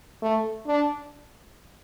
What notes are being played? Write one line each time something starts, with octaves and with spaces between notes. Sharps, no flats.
A3
D4